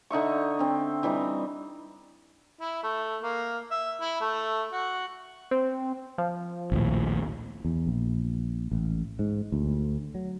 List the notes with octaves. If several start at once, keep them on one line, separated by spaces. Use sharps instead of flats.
D3 D#4 E5 C#6
D3 C4
E3 G3 C4 D#4
E4
A3
A#3
E5
E4
A3
F#4
C4
F3
A#1 D#2 A2
E2
A#1
A1
G#2
D2
F#3